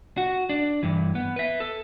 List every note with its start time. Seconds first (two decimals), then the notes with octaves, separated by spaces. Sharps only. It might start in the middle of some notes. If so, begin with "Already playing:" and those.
0.17 F#4
0.49 D4
0.83 G2 E3
1.15 B3
1.36 B4 E5
1.60 A4